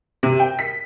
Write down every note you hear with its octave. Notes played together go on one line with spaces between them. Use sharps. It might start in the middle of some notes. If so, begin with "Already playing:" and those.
C3
G5
B6